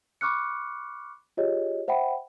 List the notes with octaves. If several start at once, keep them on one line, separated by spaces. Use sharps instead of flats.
B5 C#6 D6 F6 F#6 C#7
F4 G4 G#4 C#5 D#5
C5 E5 F#5 G5 B5